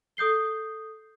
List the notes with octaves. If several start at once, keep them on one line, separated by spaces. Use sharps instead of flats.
A4 D#6 G6 C7 G7